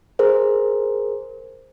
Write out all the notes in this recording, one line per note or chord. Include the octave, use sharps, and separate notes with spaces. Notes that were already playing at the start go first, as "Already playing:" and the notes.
G#4 A#4 C5